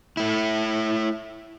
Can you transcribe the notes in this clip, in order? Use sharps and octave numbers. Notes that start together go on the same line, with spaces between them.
A3 E4